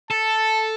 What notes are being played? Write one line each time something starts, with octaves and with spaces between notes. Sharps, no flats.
A4 A5